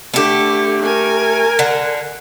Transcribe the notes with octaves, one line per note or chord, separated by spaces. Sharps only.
D3 A3 G4
A#4 G#5
D3 F#5